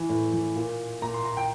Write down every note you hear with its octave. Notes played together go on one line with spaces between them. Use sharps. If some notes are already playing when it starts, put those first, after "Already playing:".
Already playing: E3
A2
E3
A#2
A#2 A#5
C6
A#5
G5